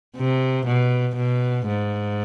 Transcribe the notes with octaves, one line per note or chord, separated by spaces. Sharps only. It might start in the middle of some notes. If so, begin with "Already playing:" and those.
C3
B2
B2
G#2